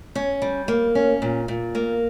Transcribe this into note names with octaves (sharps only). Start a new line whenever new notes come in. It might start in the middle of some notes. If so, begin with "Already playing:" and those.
C#4
G3
A#3
C#4
A#2
A#2
A#3